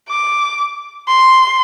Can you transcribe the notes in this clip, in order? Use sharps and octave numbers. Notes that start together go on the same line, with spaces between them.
D6
C6